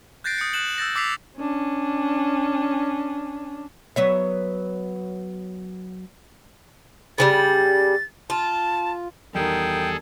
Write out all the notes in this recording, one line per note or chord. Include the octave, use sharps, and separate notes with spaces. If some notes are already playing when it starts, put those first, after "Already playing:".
F#6 G6 A6 A#6 C7 D7
D#6 C#7
F#6 E7 F#7
E6 G6 A6 A#6
D6 E6 A6 B6 C7 F7
C#4 D4
F#3 B3 C#5 E5
C#3 E3 G3 A6
F4 A5
E2 D#3 G3 G#4 A4 G5